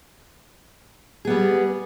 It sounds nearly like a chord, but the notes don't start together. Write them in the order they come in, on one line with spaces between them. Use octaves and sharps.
G#4 B3 G3